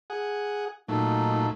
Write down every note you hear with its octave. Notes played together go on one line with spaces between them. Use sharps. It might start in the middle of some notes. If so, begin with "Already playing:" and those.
G#4 F#5
A#2 F#3 A3 D#4